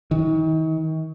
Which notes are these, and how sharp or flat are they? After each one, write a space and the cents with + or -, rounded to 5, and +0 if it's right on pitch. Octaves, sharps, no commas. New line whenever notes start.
D#3 +40